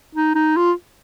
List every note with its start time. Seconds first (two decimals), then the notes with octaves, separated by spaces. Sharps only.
0.15 D#4
0.35 D#4
0.57 F4